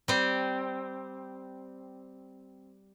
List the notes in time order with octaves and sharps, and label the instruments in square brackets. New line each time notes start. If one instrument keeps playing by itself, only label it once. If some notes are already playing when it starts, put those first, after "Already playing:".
[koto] G3 C4